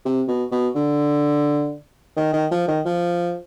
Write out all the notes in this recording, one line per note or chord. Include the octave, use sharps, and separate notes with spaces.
C3
B2
B2
D3
D#3
D#3
F3
D#3
F3